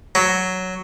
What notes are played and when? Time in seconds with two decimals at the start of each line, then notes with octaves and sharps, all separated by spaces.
0.15 F#3